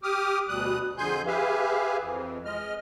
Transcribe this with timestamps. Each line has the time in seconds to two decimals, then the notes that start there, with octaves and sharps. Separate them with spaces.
0.03 G4 D6 D#6 F6
0.49 D2 B2 G3 D#6 F#6
0.98 F2 D3 G#4 G#5 C6 G6
1.26 G4 G#4 B4 E5 F5 G#5
2.00 F2 E3
2.45 G#3 D#5 F6